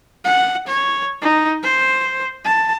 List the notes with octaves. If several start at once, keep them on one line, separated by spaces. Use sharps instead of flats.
F#5
C#5
D#4
C5
A5